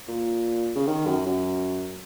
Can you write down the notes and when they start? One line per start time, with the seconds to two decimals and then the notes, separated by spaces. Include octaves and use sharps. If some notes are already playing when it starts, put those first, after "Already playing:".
0.08 A#2
0.76 C#3
0.87 D#3
1.07 F#2
1.26 F#2